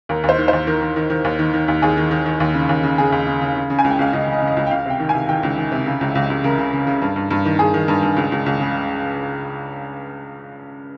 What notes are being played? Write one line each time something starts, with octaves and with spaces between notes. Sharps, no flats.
D#2 A#4
D#2
C5
D#3
D#2 C5
D#3 A#4
D#3
D#3
D#3
D#2
D#3
D#3
D#2
D#2 G#4
D#3
D#3
D#3
D#2
C#3
D#2
C#3
C#3 G#4
D#2
C#3
C#3
C#3
C#3
G#5
C#2
G5
C#2 F5
C#2 D#5
C#3
D#5
C#3
D#5
F5
C#2
G5
C#2 F5
C3 G5
D#3
C3 G#5
D#3 G5
C#2
D#3
C3
C#3
C#2
C#2
C#2
C#3 A#4
C#3
C#3
C#3
G2
G2
G2
D#3
G2 G#4
D#3
G2
G2
C#2
C#2
C#2
C#3